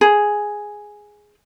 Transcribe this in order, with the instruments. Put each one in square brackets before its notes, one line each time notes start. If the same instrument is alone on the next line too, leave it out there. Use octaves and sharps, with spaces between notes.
[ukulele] G#4